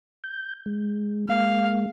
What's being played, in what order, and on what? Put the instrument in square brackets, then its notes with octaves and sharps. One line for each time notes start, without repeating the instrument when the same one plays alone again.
[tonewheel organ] G6
G#3
[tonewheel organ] G#3 A#3 [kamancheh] F5